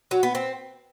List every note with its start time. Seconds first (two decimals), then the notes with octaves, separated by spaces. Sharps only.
0.11 F#3
0.23 B3
0.35 C4